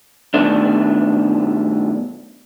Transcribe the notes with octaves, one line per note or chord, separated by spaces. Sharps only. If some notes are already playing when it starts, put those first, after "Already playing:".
G2 B2 D#3 A3 D4